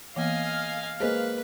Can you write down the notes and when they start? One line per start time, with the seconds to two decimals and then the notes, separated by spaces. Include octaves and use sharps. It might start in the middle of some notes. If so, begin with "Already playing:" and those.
0.16 E3 A#3 B3 D#5 F5 G#5
1.00 G#3 A#3 B4 C5 D#5 G#5